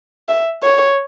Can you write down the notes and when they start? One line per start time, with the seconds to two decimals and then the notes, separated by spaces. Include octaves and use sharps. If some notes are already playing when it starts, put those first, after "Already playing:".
0.29 E5
0.63 C#5